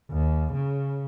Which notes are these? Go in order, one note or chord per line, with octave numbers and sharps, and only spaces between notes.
D#2
C#3